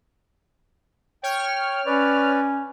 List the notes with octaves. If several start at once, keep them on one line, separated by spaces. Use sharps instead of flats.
C#5 G5 F6
C#4 B4 D5